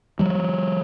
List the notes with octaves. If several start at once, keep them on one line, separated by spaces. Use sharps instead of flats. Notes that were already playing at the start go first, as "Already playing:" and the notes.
F3 G3